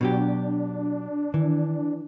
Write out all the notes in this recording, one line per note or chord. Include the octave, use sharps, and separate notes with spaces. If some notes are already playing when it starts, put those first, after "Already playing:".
B2 F#3 D4 G4
D#3 E3